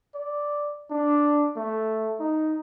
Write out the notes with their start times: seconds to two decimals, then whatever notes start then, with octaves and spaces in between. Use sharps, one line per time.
0.15 D5
0.90 D4
1.57 A3
2.20 D#4